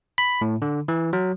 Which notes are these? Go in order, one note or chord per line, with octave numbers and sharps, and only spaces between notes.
B5
A2
D3
E3
F#3